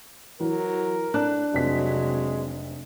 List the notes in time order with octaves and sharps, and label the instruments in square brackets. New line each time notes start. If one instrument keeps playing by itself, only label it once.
[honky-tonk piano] E3 [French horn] F#3 [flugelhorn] A#4
[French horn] A2 [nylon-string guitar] D4 [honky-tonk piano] F#6
[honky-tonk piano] F1 C3 B6 [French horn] F#3 [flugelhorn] G#3